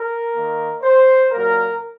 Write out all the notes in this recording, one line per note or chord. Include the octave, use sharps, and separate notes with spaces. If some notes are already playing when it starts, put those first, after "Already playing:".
Already playing: A#4
D#3 A#3
C5
A#2 F#3 A#3 A#4